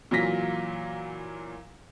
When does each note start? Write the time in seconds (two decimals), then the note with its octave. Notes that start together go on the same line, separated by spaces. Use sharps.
0.11 A#2 E3 F#3 F4 A#6 B6